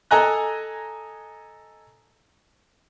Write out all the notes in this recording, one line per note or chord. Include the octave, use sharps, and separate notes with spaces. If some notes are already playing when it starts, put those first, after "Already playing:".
A4 D#5 G#5 A#5 F#6